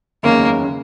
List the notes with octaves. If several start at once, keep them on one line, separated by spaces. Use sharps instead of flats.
F#1 E2 D#3 G#3 A#3 C#4
C#3